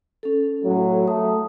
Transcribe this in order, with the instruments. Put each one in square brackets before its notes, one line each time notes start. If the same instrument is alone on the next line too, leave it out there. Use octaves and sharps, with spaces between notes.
[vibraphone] C#4 A4
[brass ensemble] A2 F#3
[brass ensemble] A3 [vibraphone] D#6